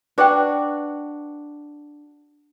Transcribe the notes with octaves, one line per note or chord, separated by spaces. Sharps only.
D4 F#4 B4 D5 G5